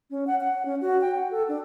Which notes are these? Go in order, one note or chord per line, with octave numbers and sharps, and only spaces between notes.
C#4
F#5
F#5
C#4
F#4
G5
F#5
A4
D4